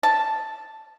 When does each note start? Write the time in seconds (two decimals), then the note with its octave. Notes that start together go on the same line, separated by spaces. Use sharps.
0.03 A5